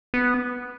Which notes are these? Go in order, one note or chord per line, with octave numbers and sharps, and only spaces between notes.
B3